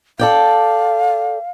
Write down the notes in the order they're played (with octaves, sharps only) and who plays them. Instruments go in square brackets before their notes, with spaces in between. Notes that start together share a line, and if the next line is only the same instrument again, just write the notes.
[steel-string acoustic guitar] A4 D5 G5 [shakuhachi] F5